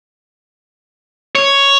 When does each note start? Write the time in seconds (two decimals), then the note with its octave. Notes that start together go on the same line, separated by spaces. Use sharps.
1.35 C#5